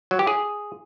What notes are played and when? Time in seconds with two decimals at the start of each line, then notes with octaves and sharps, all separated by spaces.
0.11 F#3
0.19 G4
0.27 G#4